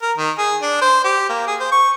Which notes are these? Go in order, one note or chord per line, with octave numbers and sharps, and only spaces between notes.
A#4
D#3
G#4
D4
C5
G4
A#3
G#4
C5
C#6